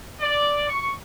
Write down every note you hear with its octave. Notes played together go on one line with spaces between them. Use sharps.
D5
C#6